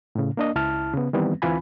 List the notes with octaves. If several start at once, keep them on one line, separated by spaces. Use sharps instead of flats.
A2 C#3
A#3 D4 D#5
C#2 E4 A5 F6
C#3 B3
D#3 E3 G3 B3 C4
D2 E3 C4 F4 G#5 B5